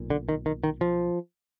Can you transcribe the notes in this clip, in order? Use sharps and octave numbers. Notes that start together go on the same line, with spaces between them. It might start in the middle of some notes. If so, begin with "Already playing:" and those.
Already playing: B1 A#2
D3
D#3
D#3
D#3
F3